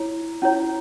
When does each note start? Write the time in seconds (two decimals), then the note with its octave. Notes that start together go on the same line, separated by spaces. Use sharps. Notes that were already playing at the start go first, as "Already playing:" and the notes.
Already playing: E4 C#5
0.42 C#4 E4 C#5